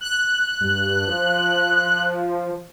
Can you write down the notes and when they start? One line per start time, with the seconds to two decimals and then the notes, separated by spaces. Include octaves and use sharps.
0.01 F#6
0.61 G2
1.07 F3